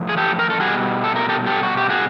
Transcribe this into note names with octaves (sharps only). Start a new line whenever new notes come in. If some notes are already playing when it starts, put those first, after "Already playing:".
Already playing: A2 F3
G#4
G4 A4
A#4
A4
B2 G3 F#4 G#4
A4
A#4
G4 A4
G4 A4
F#4
G4
F#4 G#4